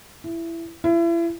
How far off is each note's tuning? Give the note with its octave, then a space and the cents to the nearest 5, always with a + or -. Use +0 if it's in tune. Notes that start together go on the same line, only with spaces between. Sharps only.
E4 +15
E4 +35